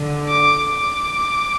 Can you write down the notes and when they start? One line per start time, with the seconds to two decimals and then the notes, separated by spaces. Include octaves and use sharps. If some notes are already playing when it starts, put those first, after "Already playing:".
Already playing: D3
0.29 D6
0.69 D6